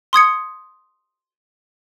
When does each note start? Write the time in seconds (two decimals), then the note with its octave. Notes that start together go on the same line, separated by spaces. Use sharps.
0.13 C6 D#6 G#6 C#7